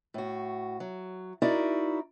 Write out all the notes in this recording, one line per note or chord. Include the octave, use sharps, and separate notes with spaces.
A2 F#4
F#3
D#4 E4 F#4 A#4 D5